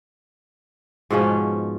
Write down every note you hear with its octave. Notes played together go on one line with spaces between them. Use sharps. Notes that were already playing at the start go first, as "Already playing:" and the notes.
G#2 B2 F3 C#4